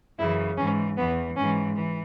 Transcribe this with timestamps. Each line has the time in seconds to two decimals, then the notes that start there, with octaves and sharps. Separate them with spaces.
0.18 F#2 C#3 E3 E4
0.57 G#2 E3 C#4
0.97 E2 E3 B3
1.36 G#2 E3 C#4
1.75 E3